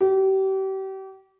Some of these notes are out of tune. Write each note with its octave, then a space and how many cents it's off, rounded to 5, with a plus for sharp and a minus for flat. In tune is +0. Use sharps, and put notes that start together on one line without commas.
G4 -35